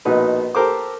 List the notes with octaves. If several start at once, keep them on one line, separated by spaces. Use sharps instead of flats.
A#1 B2 D#4 B4
G4 A4 A#4 C5 D6